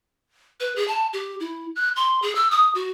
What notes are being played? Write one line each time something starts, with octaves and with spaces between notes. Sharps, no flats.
B4
G#4
A5
G4
E4
F#6
C6
G#4
E6
D#6
F#4